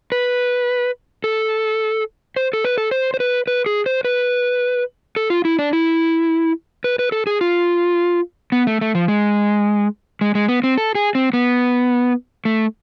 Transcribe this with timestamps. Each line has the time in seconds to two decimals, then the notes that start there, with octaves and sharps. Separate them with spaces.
0.12 B4
1.24 A4
2.36 C5
2.53 A4
2.65 B4
2.78 A4
2.91 C5
3.14 C5
3.20 B4
3.47 B4
3.66 G#4
3.86 C5
4.05 B4
5.16 A4
5.30 F4
5.45 E4
5.59 D4
5.73 E4
6.84 B4
6.99 B4
7.12 A4
7.27 G#4
7.41 F4
8.52 B3
8.67 A3
8.81 A3
8.95 F3
9.08 G#3
10.21 G#3
10.35 G#3
10.49 B3
10.64 C4
10.77 A4
10.95 G#4
11.15 C4
11.33 B3
12.45 A3